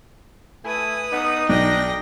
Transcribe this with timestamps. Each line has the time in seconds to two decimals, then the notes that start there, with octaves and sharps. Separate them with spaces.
0.65 A3 E4 B4 G#5 D#6
1.13 B3 D#4
1.49 B1 D4 G5 A#6